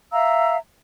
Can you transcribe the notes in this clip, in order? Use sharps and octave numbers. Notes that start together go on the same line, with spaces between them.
E5 F5 A#5 E6